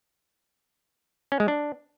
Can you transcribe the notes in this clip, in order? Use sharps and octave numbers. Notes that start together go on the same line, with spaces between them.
C#4
G#3
D4